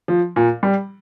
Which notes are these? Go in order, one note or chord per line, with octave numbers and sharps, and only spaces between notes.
F3
A#2
G3